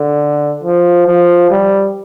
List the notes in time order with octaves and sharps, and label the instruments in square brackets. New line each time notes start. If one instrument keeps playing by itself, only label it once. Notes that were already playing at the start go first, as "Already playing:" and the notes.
Already playing: [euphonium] D3
F3
F3
G3